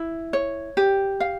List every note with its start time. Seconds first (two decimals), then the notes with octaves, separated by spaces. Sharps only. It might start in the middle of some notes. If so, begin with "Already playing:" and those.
Already playing: E4
0.33 C#5
0.77 G4
1.20 F5